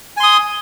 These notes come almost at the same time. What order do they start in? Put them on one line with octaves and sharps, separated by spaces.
G#5 C6 D#6